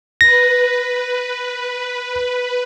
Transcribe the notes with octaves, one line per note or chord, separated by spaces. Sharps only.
B4 A#6